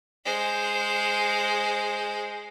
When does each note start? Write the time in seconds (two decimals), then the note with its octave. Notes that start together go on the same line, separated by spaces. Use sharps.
0.25 G#3 C5